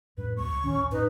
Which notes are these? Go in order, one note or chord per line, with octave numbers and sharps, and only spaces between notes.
F2 A2 G3 B4
E2 G3 A#3 C#6
C#2
A2 D#3 C#4
A1 D#2
F2 A2 D#4 B4